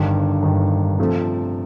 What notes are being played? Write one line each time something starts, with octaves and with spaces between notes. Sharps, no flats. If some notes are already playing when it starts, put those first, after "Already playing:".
Already playing: G1 G2 D#3
G1 G2 D#3
C3 F3 A3